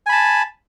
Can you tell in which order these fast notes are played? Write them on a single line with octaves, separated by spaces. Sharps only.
G#5 B5 A5